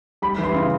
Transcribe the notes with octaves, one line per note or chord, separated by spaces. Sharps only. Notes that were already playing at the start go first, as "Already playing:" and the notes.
G3 B5
E3
C6
C#3